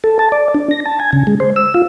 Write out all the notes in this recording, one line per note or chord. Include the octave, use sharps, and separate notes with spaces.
A4
A5
D5
D4
A#6
A5
G#5
C#3
G#3
C5
E6
F4